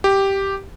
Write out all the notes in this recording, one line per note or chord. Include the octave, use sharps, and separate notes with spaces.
G4